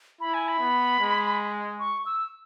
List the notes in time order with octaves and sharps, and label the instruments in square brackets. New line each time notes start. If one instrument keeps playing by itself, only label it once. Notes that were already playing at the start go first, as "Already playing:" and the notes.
[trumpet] E4 [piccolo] B5
[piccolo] G#5
B5
[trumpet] B3
G#3
[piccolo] C#6
E6